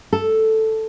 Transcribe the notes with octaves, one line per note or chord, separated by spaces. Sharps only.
A4